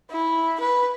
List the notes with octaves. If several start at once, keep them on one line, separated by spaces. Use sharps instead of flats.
E4
B4